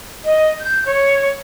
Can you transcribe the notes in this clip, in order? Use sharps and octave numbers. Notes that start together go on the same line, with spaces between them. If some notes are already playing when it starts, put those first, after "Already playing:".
D#5
G6
C#5